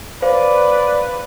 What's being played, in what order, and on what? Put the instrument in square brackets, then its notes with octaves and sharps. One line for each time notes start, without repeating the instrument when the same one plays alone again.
[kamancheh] B4 [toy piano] C5 [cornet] D5 [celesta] F5